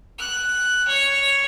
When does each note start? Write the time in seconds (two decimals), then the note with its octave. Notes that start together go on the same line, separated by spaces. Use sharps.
0.18 F#6
0.88 C#5